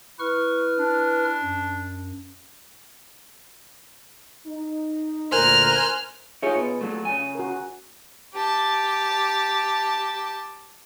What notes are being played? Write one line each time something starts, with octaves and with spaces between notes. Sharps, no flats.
E4 B4 C#6 F6
D4
F#2
D#4
D2 A#2 D3 A#4 C5 G#5 F6 F#6
D#4 F4 G4 G#4 C#5 E5
B2
F#3 A3
C#3 G#5
F#4 A#4
G4 A5